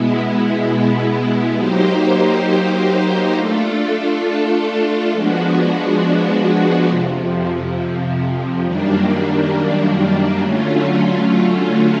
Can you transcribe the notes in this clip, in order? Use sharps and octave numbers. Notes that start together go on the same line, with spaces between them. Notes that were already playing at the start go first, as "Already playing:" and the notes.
Already playing: B2 G#3 B3 E4
F#3 A#3 D#4 G4 C5
A3 D4 F4 A4
F3 G#3 B3 D4 F#4
F2 C3 F3
F#2 D#3 G3 A#3 D4
D3 F#3 A3 C#4 F4